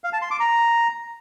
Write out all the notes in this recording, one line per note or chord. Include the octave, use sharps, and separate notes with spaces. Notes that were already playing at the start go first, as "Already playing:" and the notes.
F5
A5
C6
D6
A#5